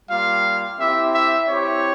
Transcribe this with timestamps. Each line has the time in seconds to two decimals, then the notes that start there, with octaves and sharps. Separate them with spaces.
0.10 G3 A#3 F4 F5
0.80 C4 E4 G4 E5
1.15 E5
1.48 C4 E4 G4 C#5